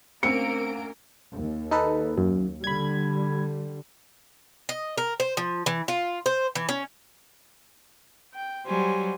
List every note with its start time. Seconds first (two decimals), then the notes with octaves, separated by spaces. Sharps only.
0.23 D2 A#3 C4 C#4 A#4 E6 C#7 D7
1.34 D#2
1.71 D#4 A4 B4
2.18 F#2
2.64 D3 G3 B5 G#6
4.69 D#5
4.98 A#4
5.20 C5
5.37 F3
5.66 E3
5.88 F4
6.26 C5
6.55 E3
6.69 C#4
8.33 G5
8.66 F#3 G3 C5 G#5